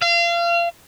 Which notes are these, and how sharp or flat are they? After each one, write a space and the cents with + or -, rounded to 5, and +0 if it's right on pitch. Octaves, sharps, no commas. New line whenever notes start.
F5 -30